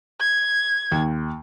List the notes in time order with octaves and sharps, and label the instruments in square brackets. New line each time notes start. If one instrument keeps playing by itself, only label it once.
[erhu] G#6
[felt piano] D#2